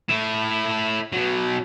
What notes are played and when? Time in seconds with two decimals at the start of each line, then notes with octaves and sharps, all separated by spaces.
0.09 A3 E4
1.13 B2 F#3